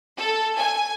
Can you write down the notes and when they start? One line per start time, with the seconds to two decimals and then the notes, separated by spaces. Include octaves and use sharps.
0.17 A4
0.58 G#5